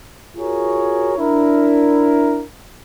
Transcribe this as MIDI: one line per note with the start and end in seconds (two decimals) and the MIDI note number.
0.37 1.14 65
0.37 1.14 66
0.37 1.14 68
0.37 1.14 70
0.37 1.14 73
1.18 2.43 62
1.18 2.43 64
1.18 2.43 70